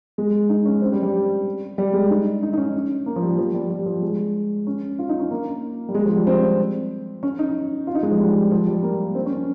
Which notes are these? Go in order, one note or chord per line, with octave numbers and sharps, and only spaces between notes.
G#3
D#4
C#4
C4
G3
G3
G3
G#3
D#4
D#4
D#4
C#4
A#3
F3
G3
F3
G3
G3
F3
G#3
C#4
F4
D#4
C#4
A#3
G3
G#3
F3
G3
C4
C#4
D#4
F4
D#4
G#3
F3
G3
F3
G3
A#3
C4
C#4
C#4